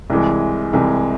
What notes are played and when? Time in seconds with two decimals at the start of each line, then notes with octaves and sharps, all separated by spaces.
0.10 C2 C3 E3 G#3
0.73 C2 C3 E3 G#3